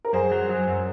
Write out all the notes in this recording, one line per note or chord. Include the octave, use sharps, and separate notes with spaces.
A#4
F#2 G#4 C5
F#3
F#3
F#2